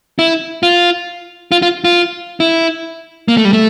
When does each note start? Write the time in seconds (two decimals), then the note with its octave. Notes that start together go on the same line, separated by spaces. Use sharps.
0.19 E4
0.63 F4
1.52 F4
1.62 F4
1.84 F4
2.40 E4
3.28 A#3
3.37 A3
3.45 G3
3.53 A3